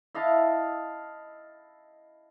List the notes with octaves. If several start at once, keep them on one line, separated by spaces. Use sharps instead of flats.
E4 D#5 F5 A5